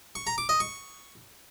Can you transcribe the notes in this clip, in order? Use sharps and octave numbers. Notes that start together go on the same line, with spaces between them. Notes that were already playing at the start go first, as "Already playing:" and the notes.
C#6
A#5
D6
D#5
C#6